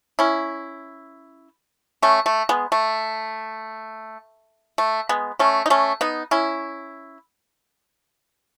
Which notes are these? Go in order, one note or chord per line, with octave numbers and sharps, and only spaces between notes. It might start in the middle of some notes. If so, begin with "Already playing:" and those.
C#4 E4
A3 C#4
A3
G#3 B3
A3
A3
G#3 B3
A3 C#4
D#4
A3 C#4
B3 D#4
C#4 E4